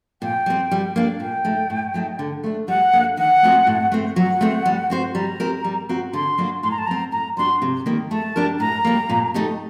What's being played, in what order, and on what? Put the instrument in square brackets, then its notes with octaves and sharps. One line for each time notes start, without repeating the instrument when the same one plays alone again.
[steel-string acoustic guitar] A#2 [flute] G5
[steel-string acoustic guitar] G3 C4
G3
A#3 D4
[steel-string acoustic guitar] A#2 [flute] G5
[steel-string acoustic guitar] A3 D#4
A2
F#3 A3 D#4
D3
A3 D4
[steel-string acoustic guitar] G3 [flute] F#5
[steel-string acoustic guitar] A#3 D4 A4
[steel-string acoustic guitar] D#3 [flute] F#5
[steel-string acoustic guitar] A3 C4 F#4 C5
A2
A3 C4
[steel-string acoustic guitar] F#3 [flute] F#5
[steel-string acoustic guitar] A3 C4
G3
C4 F#4 C5
[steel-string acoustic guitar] G3 [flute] A#5
[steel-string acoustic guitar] C4 G4 A#4
G3
C4 F#4
[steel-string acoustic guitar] D3 [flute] C6
[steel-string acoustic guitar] F#3 A#3 D4 F#4
[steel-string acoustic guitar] A2 [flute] C6
[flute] A#5
A5
[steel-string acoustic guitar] F#3 C4 [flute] A#5
[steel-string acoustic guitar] A2 [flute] A#5
[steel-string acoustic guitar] G3 D4 F#4 [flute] C6
[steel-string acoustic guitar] C3
D#3 G3 A#3
[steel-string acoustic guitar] A3 [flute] A5
[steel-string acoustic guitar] D4 G4 A#4
[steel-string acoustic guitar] A2 [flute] A#5
[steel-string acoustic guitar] G3 A#3
A#2
A3 D#4 G4